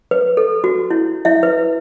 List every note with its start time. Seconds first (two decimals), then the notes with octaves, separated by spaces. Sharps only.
0.11 B4
0.37 A4
0.64 F#4
0.91 E4
1.25 E4 E5
1.43 B4